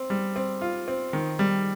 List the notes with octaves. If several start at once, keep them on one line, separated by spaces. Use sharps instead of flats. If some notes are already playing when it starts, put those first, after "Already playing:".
Already playing: C4
G3
C4
F4
C4
D#3
G3